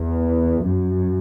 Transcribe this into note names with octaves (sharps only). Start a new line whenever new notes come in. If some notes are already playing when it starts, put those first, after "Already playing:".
Already playing: E2
F#2